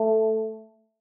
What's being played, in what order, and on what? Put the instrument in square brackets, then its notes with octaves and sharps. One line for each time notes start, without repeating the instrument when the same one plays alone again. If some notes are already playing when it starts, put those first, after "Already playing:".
Already playing: [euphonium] A3